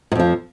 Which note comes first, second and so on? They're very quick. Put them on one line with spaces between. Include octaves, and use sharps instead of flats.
G#2 F2 F3